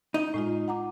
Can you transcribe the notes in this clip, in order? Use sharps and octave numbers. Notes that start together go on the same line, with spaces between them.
D#4
A2 G#3 F4
F#5 A#5 D6